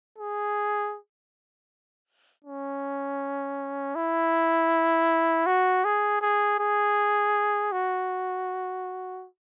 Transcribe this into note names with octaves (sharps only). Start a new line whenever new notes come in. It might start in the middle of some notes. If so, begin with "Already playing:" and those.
G#4
C#4
E4
F#4
G#4
G#4
G#4
F#4